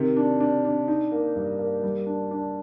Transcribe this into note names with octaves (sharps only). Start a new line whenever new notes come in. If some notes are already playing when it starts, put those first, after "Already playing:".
Already playing: C3 D#3
D4
D4
D4
D#4
A#3
G2
A#3
G3
D4
D4